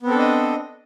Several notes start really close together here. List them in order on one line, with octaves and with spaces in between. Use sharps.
B3 C4 A4 D4 D#5